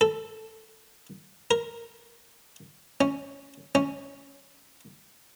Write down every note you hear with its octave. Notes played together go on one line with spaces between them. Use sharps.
A4
A#4
C#4
C#4